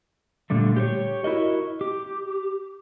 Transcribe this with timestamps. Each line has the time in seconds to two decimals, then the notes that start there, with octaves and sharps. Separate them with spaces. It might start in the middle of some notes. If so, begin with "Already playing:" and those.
0.50 A#2 D3 G3 A3
0.77 G4 C5 C#5
1.24 E4 F#4 A#4 D#5
1.81 G4